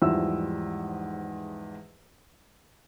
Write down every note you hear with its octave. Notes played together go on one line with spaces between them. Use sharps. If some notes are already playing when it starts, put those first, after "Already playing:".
E2 G#2 F3 G3 E5 E6